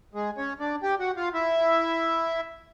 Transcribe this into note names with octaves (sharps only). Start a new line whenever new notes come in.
G#3 G#4
C#4 C#5
D4 D5
G4 G5
F#4 F#5
F4 F5
E4 E5